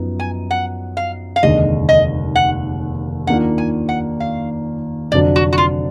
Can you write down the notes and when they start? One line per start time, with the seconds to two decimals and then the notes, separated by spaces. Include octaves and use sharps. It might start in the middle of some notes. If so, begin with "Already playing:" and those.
Already playing: F#2 F3 B3 D#4
0.20 G#5
0.51 F#5
0.97 F5
1.36 F5
1.43 F1 D#2 D3 G#3 D#5
1.89 D#5
2.36 F#5
3.27 D#2 D#3 A#3 D4 F4 F#5
3.58 G#5
3.89 F#5
4.20 F5
5.12 F1 F2 D3 F#3 D4 D5
5.36 F#4
5.53 F#4
5.58 F4